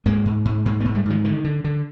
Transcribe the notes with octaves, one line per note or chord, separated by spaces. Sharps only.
G#2 G#3 A#3
G#2
G#2
G#2 G#3 A#3
A3 B3
G#2
G3 A3
G#2 D#3 F3
D3 D#3
D3
D3